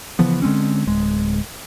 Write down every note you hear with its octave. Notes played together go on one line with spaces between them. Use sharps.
C#3 E3 F3 B3
D3 G#3 C4 C#4
D1 G#3